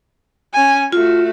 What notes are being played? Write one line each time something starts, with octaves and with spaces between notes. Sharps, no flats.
C#4 G#5
A3 F4 F#4